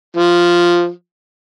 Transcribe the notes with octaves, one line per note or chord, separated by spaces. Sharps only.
F3